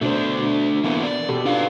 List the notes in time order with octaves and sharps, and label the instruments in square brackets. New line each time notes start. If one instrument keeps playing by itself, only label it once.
[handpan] B2 C5 [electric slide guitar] A3 D4
[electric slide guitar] E3 A#3 B3
D5
[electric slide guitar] B2 [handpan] G4 A4
[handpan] D4 F4 [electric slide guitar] D#4 B4 F5